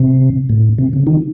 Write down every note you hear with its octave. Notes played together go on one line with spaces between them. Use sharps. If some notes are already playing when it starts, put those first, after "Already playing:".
Already playing: C3
A2
C3
C#3
D#3